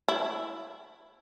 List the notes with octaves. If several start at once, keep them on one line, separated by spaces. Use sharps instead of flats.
E4